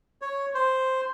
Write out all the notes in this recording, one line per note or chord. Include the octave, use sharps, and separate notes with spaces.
C#5
C5